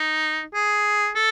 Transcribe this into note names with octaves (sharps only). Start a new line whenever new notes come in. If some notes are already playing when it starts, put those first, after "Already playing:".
Already playing: D#4
G#4
A4